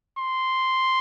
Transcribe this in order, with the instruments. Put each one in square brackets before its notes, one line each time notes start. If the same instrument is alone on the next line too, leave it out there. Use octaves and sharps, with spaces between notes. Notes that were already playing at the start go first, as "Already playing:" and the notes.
[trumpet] C6